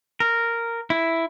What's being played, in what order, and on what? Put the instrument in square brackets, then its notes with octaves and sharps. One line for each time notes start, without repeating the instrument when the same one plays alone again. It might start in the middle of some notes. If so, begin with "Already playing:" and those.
[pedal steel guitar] A#4
E4